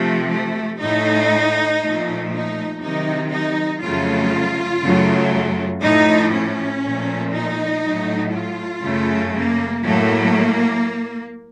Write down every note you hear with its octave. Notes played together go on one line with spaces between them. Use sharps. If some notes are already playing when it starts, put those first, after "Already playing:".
Already playing: C3 F3 A3
A3
A2 A3 D#4
A#2 F3 A3
D#4
C3 D#3 F#3 D#4
D#4
F2 C#3 F#3 A3 F4
F#2 C#3 F#3 A3
A2 F3 A3 D#4
C#4
A#2 F3 A3
D#4
A2 F#3 A3
F4
F#2 C#3 A3
A#3
A2 F#3 A3 A#3